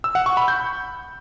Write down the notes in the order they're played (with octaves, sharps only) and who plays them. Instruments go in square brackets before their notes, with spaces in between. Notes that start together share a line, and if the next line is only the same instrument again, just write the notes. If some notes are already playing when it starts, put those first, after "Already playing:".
[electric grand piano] E6
F#5
C#6
B5
G6